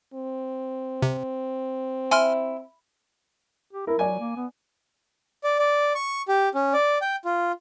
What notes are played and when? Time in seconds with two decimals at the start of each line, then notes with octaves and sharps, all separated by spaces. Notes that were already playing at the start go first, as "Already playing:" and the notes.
0.14 C4
1.02 C3
2.11 E4 G#5 C6 F6
3.73 G4
3.87 E4 A#4
3.99 F#3 D5 G#5
4.20 A#3
4.37 B3
5.44 D5
5.59 D5
5.95 C#6
6.28 G4
6.54 C#4
6.73 D5
7.02 G5
7.25 F4